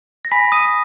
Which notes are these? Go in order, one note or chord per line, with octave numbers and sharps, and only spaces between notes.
A#6
G#5 B5 B6
D#6 D#7